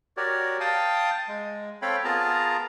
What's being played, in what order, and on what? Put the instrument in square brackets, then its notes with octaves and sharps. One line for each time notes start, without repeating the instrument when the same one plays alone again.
[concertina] F#4 G4 A#4 C#5 D5
F5 G5 A5 D#6
G#3
C4 A4 C#5 F5 G5 B5
B3 F4 G#4 A#4 A5 A#5